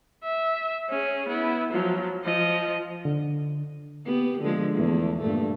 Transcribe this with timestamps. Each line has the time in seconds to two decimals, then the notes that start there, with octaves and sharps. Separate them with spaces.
0.24 E5
0.90 C#4 G#4
1.28 B3 E4
1.72 F3 F#3
2.24 F3 D#5
3.05 D3
4.05 B3 G4
4.41 D3 F3 G#3
4.74 E2 A3
5.20 G2 A#2 A3